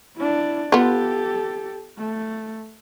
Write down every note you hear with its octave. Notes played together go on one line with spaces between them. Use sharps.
D4 E4
B3 F4 G4 A4
A3